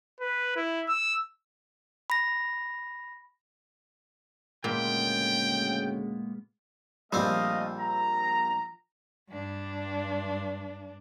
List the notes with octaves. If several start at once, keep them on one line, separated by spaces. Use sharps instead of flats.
B4
E4
E6
B5 A#6
D2 A#2 C#3 G#3 A#3 B3 G5
A#1 G3 A3 C4 D#5 F5 E6
A#5
G2 D4